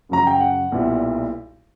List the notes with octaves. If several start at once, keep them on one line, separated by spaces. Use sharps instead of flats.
F#2 C#3 F#3 A#5
G5
F#5
B1 A#2 G3 B3 E4